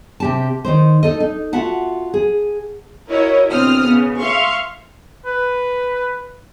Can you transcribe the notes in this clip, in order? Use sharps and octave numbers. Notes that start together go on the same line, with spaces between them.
C3 G4 A5
D#3 D#4 C5
D#4 A4 D#5
D#4
F4 F#4 E5 F#5 A5
G#4
E4 F#4 A#4 C#5 D#5
B2 D3 C4 D#6 F6
C#3 B3
E5 F5 C6 C#6
B4